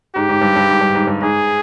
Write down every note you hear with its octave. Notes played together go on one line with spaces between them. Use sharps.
G#2 G4
G#2
G2
G2
G#2
G2
G#2
G2
G#2 G#4